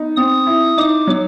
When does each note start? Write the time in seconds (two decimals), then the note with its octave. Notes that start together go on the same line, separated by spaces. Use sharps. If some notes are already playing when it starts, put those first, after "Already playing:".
Already playing: B3 D#4
0.16 C4 D#6
0.47 E4
0.77 D#4 D6
1.07 F#3